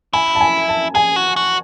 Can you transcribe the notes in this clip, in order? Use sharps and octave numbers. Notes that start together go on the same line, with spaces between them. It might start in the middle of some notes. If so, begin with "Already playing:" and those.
E4 G#5
A5
G#5
A5
G#4 G#5
F#4
F#4